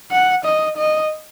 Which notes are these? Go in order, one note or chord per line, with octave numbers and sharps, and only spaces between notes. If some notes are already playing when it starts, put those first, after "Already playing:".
F#5
D#5
D#5